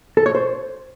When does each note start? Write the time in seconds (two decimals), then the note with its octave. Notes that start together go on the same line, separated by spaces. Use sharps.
0.17 A4
0.26 C#5
0.35 C5